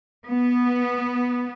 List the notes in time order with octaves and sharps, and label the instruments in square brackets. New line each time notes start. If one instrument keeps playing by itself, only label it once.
[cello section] B3